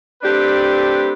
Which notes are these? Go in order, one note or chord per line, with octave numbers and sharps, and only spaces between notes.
A3 C4 D4 G4 B4